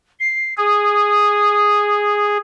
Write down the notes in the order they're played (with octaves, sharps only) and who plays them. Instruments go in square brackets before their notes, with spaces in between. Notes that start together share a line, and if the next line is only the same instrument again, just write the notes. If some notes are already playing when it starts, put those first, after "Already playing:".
[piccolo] C7
[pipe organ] G#4 [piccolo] D#6